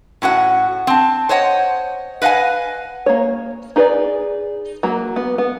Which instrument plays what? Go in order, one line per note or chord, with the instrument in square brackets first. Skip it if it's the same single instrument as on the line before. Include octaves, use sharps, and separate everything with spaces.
[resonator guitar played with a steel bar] A2 C#4 F#4 F#5
C4 A5
C5 C#5 D#5 F#5
B4 D#5 F5 F#5 G#5
[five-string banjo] A#3 C#5
D#4 G#4 B4 C5 D5
F#3 A#3
B3
B3